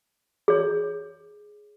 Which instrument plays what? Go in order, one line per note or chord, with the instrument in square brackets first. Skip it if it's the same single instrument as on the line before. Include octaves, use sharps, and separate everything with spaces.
[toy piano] G#4 C#5